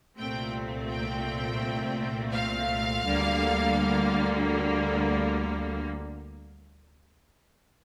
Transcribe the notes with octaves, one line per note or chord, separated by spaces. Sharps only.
C2 A#2 A3 C4 G5
G5
F5
D2 D3 G3 A#3